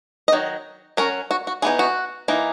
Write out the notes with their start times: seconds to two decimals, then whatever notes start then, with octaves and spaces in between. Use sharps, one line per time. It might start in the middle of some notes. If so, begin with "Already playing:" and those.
0.28 D#5
0.32 D#3 F#3
0.97 F#3 C#4 A#4
1.31 F#4
1.47 F#4
1.62 E3 B3 D#4 G#4
1.79 F#4
2.28 E3 A#3 D#4